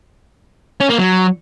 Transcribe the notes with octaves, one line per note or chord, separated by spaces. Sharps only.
C#4
A#3
F#3